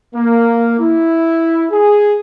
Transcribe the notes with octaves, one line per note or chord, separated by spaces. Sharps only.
A#3
E4
G#4